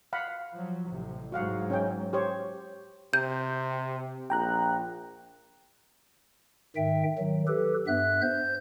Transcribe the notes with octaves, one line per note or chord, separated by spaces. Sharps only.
F5 F#5 B5
F3 F#3
A1 C3
G#2 F#3 F#4 F5 F#5
C#4 C#5 G5
G4 C5 C#5
C3 G6
A#1 G5 A#5 F#6
G#2 D#3 E5 G5
D#3 F#3
G4 A4 B4
G2 B3 E5 F#6
C5 G6